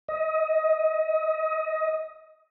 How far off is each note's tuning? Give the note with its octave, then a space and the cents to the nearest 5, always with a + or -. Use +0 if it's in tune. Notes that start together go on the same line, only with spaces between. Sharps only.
D#5 +25